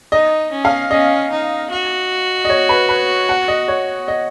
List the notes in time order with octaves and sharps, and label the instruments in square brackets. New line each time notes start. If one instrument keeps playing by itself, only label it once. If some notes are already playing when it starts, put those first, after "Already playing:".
[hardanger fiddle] D#4 [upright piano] D#5
[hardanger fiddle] C#4
[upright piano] F5
[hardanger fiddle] C#4 [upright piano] D#5
[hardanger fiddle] D#4
F#4
[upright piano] D#5
C#5
B4
B4
F#5
D#5
C#5
D#5